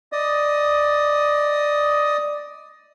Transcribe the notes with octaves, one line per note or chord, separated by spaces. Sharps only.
D5 D#5 D#6